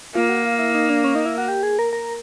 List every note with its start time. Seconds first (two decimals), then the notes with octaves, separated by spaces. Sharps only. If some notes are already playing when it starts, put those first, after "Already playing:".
0.15 A#3 F4
0.29 F#4
0.45 F4
0.59 E4
0.75 D#4
0.90 D4
1.04 C#4
1.15 D#4
1.26 E4
1.38 F#4
1.48 G4
1.63 G#4
1.79 A#4
1.93 A#4